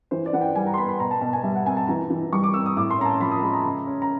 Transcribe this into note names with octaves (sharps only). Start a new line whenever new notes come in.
E3 C5
D5
E3 F#5
G5
G3 G#5
A#5
C6
B3 B5
B5
B2 A#5
A5
B2 A5
G#5
G3 E5
F#5
C4 G#5
A5
E3 A#5
E3
G3 C#6
D6
C4 E6
D#6
A2 D6
C6
C#4 A#5
A5
F3 B5
D#6
G#3 B5
A#5
C#3
C#4
A#5